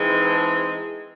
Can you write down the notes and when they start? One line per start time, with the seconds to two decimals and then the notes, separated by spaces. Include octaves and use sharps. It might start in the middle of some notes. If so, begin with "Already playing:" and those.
Already playing: E3 G#3 C4 D#4
0.24 A5